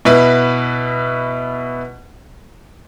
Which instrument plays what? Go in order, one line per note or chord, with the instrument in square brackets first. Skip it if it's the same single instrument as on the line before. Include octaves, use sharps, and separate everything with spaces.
[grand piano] B2 E4 B4